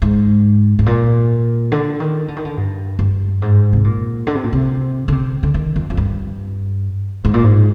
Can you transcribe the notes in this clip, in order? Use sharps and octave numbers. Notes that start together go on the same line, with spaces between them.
G#2
G#2
A#2
D3
D#3
D3
D#3
D3
G2
G2
G#2
C3
A#2
D3
C3
A#2
C3
D3
C3
D3
D#3
F2
F2
G2
G#2
A#2
G#2